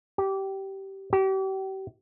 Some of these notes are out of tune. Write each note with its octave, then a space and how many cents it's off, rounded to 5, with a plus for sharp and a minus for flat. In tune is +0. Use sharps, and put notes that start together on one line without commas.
G4 -15
G4 -35